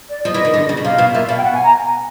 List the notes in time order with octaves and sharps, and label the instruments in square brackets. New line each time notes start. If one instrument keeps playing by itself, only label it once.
[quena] D5
[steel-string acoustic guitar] F3 [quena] D#5
[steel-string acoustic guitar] E3
D#3
D3
C#3
B2
[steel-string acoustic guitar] C3 [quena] F5
[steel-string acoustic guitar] B2
[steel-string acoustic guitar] A#2 [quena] E5
[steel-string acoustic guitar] B2 [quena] F5
[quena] G5
F#5
G#5
A#5